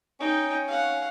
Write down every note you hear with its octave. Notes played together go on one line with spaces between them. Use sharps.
C#4 D#4 G5
F5 F#5